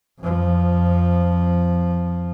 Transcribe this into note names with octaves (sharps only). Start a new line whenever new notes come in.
F2 F3